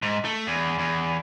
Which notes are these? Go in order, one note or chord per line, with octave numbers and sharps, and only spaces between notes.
G#2
A3
E2
E2